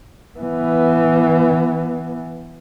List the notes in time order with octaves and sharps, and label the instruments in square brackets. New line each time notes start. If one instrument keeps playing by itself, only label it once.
[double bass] E3 B3